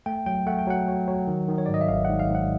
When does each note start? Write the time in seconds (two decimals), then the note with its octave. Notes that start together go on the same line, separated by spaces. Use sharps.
0.06 A3 G5
0.26 F#3 G5
0.46 A3 F#5
0.59 G5
0.67 F#3 F#5
0.88 F#3
1.08 F#3
1.28 D#3
1.48 D#3
1.58 C#5
1.66 D5
1.69 G#2
1.74 D#5
1.81 E5
1.89 G#1 F5
2.05 G#2 F#5
2.19 F5
2.30 G#2 F#5